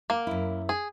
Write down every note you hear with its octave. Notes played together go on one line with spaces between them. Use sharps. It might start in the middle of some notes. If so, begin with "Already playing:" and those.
A#3 F5 F#5
F#2 E4
G#4